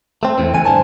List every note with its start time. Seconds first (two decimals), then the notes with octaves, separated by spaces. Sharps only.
0.23 A3 C4
0.38 E2 A2 C4
0.54 C#2 E3 A3 G#5
0.65 G2 D3 C5 G#5 A5